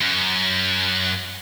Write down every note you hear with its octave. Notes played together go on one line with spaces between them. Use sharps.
F#2